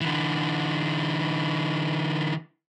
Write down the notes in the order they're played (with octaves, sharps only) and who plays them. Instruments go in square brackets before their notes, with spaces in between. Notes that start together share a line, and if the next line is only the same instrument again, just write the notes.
[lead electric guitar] D3 E3